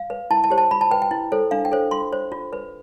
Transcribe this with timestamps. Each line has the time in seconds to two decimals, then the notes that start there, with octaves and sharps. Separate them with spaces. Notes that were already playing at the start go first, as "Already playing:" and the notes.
Already playing: F5
0.10 B4
0.30 E4 A5
0.44 A5
0.50 G4 C5
0.58 A5
0.71 F4 B5
0.81 A5
0.91 B4 G5
1.02 G5
1.11 E4
1.32 A4 C5
1.51 D4 F5
1.65 G5
1.72 A4 C5
1.91 F4 C6
2.13 C5
2.32 F4
2.53 B4